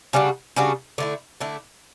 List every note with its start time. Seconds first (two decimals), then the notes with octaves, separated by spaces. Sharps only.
0.13 C#3 G3 D4 F#4
0.56 C#3 G3 D4 F#4
0.98 D3 A3 E4
1.40 D3 A3 E4